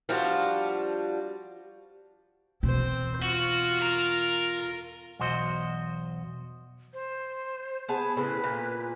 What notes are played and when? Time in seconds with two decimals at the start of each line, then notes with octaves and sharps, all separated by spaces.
0.09 F3 G3 D4 F4 F#4
2.63 E2 B2 C4 C5
3.23 F4 F#4
3.82 A#4
5.20 B1 E2 F#4 C5 D#5
6.93 C5
7.88 B3 G#4 A5
8.16 A2 C#3 C4 B4
8.44 A#2